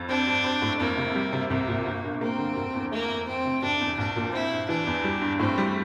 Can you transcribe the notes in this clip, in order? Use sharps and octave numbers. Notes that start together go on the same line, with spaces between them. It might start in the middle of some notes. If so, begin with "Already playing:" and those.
Already playing: F2
C4 D4
G2
C4
A2
F2 A#3
C3
G3
C3
C2 A#3
A#2
G1
G2
A#3 C4
D3
F1
E2
A3 A#3
F2
F2 C4
C3
F1 D4
E2
A#1 D4
A#2
C4 E4
G2
E3 D4
E2
G3
G2
A2 C4
G3